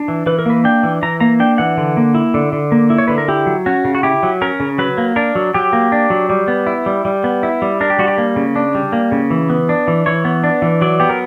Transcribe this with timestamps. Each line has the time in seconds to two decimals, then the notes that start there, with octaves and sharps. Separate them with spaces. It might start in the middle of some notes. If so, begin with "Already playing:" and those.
Already playing: D4
0.08 E3
0.26 E3 B4
0.39 A#4
0.46 A#3 B4
0.64 D4 G5
0.83 E3
1.03 E3 A#5
1.20 A#3 A#5
1.40 D4 G5
1.58 E3 F#5
1.77 D3
1.97 A#3
2.15 E4
2.34 D3
2.52 D3
2.72 A#3
2.90 E4
2.98 C#5
3.08 D3 B4
3.18 A#4
3.28 E4 G4
3.46 F#3
3.66 C#4 F#4
3.85 C#3
3.95 F#4
4.03 E4 G4
4.23 F#3
4.41 C#4 A#4
4.60 C#3
4.78 F#3 B4
4.98 A#3
5.16 D4 A#4
5.35 F#3
5.54 F#3 G4
5.73 A#3
5.92 D4
6.10 F#3
6.30 G3
6.48 B3
6.67 E4
6.86 G3
7.05 G3
7.24 B3
7.43 E4
7.62 G3
7.81 D4 A#4
7.90 G4
7.99 G3 F#4
8.08 G4
8.18 A#3
8.36 C#3
8.56 D4
8.75 G3
8.93 A#3
9.12 C#3
9.30 E3
9.50 B3
9.69 D4
9.88 E3
10.06 E3 C#5
10.25 B3
10.43 D4
10.62 E3
10.81 F#3 D5
11.00 B3 G4
11.10 A#4